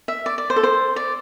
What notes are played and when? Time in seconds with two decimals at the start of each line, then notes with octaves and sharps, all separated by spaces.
0.08 E5
0.26 D5
0.38 D5
0.50 C5
0.56 A4
0.63 C5
0.96 D5